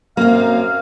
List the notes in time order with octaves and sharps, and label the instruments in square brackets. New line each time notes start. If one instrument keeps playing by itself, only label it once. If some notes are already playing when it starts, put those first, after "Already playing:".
[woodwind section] F#2 F5 [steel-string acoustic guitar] A#3 C4